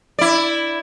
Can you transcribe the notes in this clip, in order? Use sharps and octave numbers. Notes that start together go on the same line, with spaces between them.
E4 D5